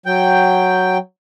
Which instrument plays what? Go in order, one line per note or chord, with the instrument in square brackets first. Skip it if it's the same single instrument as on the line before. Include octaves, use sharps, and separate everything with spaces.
[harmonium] F#3 G5